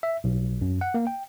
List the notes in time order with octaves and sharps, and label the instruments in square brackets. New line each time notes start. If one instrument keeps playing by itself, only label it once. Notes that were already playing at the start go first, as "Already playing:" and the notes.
[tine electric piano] E5
B1
F#2
F#5
A#3
G5